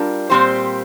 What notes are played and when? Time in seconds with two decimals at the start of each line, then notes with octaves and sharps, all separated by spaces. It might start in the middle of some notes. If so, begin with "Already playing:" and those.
Already playing: G3 D4 F4 A#4
0.30 A#2 G3 C4 G4 C5